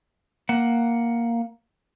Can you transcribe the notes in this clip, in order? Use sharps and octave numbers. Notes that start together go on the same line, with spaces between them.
A#3 F#5